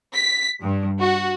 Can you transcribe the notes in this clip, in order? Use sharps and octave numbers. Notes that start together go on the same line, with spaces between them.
B6
G2
F#4